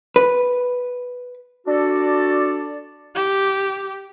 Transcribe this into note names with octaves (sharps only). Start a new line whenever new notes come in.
B4
D4 F#4 A4 D5
G4